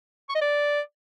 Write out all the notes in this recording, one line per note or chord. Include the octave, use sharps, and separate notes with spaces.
C#6
D#5
D5